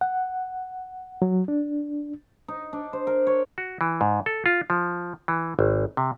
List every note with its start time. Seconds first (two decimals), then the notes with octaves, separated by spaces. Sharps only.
0.01 F#5
1.22 F#3
1.48 D4
2.48 D#4
2.73 D4
2.93 C5
3.07 A#4
3.27 C#5
3.58 F#4
3.81 E3
4.01 G#2
4.26 A4
4.46 F4
4.70 F3
5.28 E3
5.59 G#1
5.97 C3